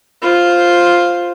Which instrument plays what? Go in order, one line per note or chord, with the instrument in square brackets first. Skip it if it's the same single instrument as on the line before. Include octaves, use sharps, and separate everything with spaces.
[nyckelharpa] F4 C5